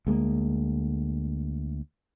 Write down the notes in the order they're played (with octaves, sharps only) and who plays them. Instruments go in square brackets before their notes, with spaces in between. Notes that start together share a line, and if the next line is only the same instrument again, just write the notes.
[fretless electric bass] D2 G#3 A#3